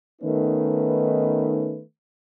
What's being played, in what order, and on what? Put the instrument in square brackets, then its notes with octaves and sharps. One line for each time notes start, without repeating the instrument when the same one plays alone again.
[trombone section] D#3 A3 B3 C#4 D#4 B4